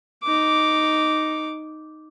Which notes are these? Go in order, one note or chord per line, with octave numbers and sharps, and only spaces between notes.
D#4 D6